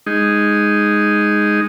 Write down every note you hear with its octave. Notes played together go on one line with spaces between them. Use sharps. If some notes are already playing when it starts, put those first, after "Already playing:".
G#3 D#4